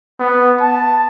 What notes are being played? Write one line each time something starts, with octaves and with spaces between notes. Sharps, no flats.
B3
A5